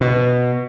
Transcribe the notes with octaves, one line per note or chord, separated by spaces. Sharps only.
B2